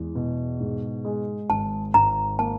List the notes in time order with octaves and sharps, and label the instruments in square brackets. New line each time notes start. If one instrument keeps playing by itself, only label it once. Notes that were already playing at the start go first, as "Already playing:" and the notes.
Already playing: [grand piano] E2 G#3
B2
G#2
G#3
[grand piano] G#1 [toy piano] A5
[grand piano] G#1 [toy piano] A#5
[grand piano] A#3 [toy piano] A5